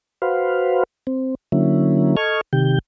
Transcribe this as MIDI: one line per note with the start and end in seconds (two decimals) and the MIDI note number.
0.22 0.83 66
0.22 0.83 71
0.22 0.83 72
0.22 0.83 77
1.07 1.35 60
1.52 2.16 50
1.52 2.16 54
1.52 2.16 58
1.52 2.16 61
1.52 2.16 64
2.17 2.41 69
2.17 2.41 75
2.17 2.41 85
2.17 2.41 89
2.17 2.41 92
2.53 2.79 48
2.53 2.79 51
2.53 2.79 67
2.53 2.79 91